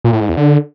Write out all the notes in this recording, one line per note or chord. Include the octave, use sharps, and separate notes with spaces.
A#2
A2
G#2
E2
D3